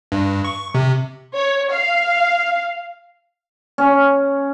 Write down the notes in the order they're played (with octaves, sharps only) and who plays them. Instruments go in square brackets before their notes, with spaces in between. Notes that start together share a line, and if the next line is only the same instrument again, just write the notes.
[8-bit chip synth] G2
C#6
C3
[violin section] C#5
F5
[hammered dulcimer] C#4